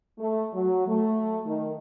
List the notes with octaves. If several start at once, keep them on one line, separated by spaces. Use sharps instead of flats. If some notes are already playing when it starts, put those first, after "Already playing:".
A3
F#3
A3
D#3